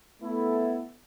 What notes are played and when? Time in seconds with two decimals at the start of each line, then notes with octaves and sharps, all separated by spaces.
0.22 A3 B3 E4 A4